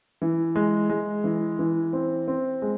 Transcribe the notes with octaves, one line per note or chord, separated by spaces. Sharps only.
E3
G#3
G#3
E3
E3
C4
C4
G#3